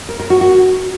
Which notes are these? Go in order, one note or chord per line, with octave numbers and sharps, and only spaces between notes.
A#4
A#4
F#4
F#4